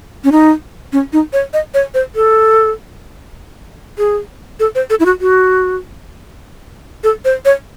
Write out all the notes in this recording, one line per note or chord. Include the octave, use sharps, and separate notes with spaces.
C#4
D#4
C#4
D#4
C#5
D#5
C#5
C5
A4
G#4
A4
C5
A4
E4
F#4
F#4
A4
C5
C#5